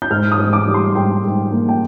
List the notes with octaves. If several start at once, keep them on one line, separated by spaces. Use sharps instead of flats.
G6
G#2 F6
D#6
G#2
D6
G3
C6
G#2 G5
G#2
A#3
G5